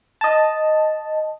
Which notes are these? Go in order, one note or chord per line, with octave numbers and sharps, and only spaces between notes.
D#5 A5